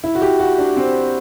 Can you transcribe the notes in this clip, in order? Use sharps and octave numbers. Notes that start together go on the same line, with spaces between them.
E4
F#4
G4
F#4
D4
C4